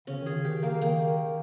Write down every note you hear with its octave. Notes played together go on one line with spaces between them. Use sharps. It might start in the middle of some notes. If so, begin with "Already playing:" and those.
C#3 C#4
D#3
G#4
C#3
D#3 G4
C#3 A#3
D#3 A#3